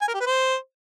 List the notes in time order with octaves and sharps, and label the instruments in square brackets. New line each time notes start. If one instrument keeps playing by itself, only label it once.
[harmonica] G#5
A#4
G4
B4
C5